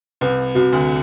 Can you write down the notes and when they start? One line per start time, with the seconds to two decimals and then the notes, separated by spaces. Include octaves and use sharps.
0.21 C2 C3 B4
0.55 C2 C3 F#4
0.72 D2 D3